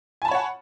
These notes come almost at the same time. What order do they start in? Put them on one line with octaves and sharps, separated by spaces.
G#5 A5 B5 C#5 F#5